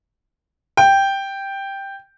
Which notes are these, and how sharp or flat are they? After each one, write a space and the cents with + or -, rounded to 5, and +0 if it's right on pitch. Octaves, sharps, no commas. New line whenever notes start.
G5 +0